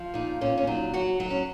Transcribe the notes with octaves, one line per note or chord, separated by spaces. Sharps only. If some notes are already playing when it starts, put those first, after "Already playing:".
Already playing: F3
A#2 D#4
A#2 C#4
C#4
F#3 D#4
F#3 F#4
F#3 D#4
C#4